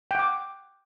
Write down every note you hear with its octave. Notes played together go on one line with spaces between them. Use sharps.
F#5 G5 D6